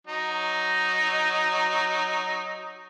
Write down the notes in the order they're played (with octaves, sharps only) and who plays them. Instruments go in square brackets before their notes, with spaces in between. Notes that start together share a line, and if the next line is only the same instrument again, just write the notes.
[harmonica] F#3 D#4